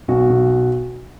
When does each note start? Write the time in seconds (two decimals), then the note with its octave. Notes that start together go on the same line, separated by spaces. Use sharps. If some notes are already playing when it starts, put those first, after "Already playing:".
0.08 B1 F#4
0.30 B1